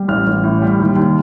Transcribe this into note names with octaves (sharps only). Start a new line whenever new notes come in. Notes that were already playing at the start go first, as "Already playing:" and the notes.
Already playing: G3
A1 F6
A1
A2
G3
D#2
D#2